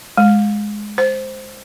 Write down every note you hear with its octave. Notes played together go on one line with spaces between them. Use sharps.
G#3
C5